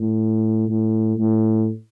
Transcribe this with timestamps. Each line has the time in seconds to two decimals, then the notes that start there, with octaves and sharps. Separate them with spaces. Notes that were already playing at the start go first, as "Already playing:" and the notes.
Already playing: A2
0.68 A2
1.18 A2